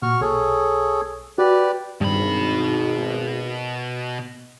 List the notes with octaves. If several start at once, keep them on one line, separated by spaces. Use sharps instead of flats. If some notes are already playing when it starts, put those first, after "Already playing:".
A#2 F#4 C#6 F6
B1 G#4 A4 C#5
F#4 G4 B4 D5
G#1 G2 B2 B5